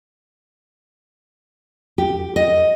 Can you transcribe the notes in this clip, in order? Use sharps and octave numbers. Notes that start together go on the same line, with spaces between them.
G4
D#5